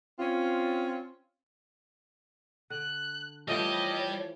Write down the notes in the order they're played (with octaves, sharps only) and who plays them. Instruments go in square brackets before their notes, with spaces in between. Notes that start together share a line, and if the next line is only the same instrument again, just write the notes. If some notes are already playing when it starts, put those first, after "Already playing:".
[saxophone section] C4 C#4 F4
[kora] D3 [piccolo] F#6
[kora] E3 F3 A3 [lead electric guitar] G3 G4 [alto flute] C#5 [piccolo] D#5